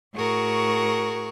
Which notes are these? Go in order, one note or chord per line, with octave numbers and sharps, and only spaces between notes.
A2 F#4 G#4 A#4 C#6